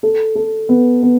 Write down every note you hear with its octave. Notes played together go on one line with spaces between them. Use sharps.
A4
A4
B3
B3